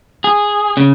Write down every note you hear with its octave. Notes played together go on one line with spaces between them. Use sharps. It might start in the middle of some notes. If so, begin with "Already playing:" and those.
G#4
C#3